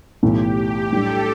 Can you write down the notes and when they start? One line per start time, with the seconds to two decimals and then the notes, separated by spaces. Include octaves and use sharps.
0.23 B1 A2 E3 G4
0.92 A2 G3 D4 A4